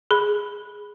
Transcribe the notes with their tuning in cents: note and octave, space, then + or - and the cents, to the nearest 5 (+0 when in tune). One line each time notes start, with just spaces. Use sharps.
G#4 +0 B5 +0